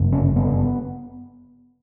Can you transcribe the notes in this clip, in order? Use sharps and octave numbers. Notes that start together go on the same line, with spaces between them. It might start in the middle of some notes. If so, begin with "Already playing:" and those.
Already playing: G1 F#2 C#3
C#4
B3